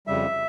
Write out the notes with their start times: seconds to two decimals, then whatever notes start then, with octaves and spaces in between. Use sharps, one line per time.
0.07 F2 C#3 G3 E5